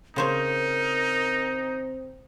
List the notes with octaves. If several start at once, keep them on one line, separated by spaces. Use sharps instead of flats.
C#3 C4 D#4 A#4 C5 C#5